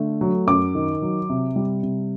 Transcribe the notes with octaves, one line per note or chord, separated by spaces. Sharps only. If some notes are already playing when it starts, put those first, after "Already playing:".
Already playing: D3 A3
F#3
F#2 D6
D#3
F#3
C3
G3
C3